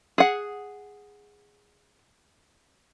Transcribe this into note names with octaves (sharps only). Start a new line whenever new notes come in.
G#4 F#5